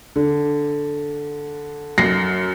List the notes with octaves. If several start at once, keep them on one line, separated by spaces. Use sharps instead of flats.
D3
F#2 A#6 C7